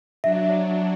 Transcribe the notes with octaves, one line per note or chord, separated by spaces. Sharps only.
F#3 D4 E5